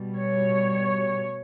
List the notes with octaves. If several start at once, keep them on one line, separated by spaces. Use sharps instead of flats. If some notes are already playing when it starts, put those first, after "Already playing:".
Already playing: B2 G3
C#5